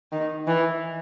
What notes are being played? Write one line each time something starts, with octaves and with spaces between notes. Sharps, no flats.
D#3
E3